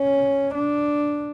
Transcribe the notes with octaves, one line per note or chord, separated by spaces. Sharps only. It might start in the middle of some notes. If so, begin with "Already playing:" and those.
Already playing: C#4
D4